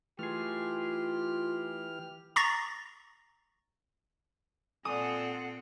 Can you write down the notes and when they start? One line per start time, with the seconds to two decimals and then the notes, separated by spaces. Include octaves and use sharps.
0.19 E3 A3 F4 G4 G#4 F6
2.36 A#5 C#6 A6 A#6
4.85 A#2 C4 A4 D5 F#5 G#5 D#6